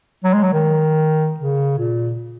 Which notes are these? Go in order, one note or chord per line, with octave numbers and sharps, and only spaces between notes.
F#3
G#3
F#3
D#3
C#3
A#2